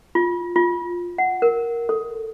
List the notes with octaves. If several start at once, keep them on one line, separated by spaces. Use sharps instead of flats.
F4
F4
F#5
A#4
A4